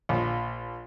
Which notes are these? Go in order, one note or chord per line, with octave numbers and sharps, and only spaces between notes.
A#1